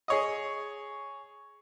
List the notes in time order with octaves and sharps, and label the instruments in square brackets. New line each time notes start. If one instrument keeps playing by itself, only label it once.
[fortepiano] G#4 C#5 D#5